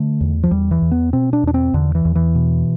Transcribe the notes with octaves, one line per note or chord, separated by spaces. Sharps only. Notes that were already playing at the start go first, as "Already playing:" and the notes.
Already playing: D3 A3
E2
F3
E2 G3
E3
E2
B3
B2 C4
D4
E2 D4
C4
E2 D3
E3
E2
E3
B2